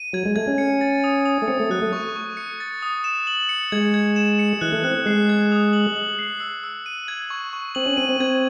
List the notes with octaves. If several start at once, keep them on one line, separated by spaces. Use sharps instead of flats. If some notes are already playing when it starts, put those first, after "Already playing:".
Already playing: D#7
F#3 G#6
G#3
A3 G#6
C#4
C#7
A6
D#6
D#6
A3
C4 C#7
A3
F#3 F#6
A3
C#6
C#6
C#7
A6
D#6
E7
F#7
C#7
G#3 G#6
G#6
E7
C#7
E3 F#6
A3
C4 F#6
G#3 C7
G#6
D#6
F#7
F#7
C7
E6
E6
D#7
G#6
C#6
C#6
C4 F#7
C#4
C4 D#7
C4
C4 G#6